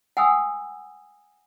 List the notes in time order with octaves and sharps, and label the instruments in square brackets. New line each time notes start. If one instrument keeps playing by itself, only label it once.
[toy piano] F#5 G#5 B5 D#6 E6